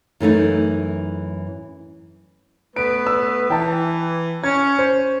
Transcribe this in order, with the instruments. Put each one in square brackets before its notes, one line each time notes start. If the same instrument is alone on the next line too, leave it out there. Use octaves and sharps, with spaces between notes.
[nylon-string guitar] F#2 E3 A3 D#4
[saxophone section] A3 B3 B4 [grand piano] D7
[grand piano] E6
[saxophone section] E3 [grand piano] G5 A5
[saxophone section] C#4 [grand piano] G#6
[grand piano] C5